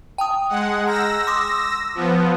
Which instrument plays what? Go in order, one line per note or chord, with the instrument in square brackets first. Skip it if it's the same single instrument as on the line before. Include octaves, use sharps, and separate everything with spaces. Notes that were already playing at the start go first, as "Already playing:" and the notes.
[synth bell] G5 A5 D#6
[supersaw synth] G#3 F#5
[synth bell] A#5 F6 G6 [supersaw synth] E6 A#6
[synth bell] C6 D6 D#6
[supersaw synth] F3 B3